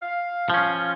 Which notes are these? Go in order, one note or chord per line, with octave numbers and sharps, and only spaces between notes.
F5
F3 C#4